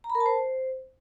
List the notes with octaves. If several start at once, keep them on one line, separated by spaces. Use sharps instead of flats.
A#5
B5
A#4
A5
C5